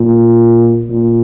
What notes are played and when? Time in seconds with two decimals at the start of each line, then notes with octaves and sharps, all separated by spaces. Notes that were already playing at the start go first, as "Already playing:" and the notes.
Already playing: A#2
0.90 A#2